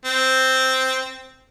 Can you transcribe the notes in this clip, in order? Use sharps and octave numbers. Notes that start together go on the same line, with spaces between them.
C4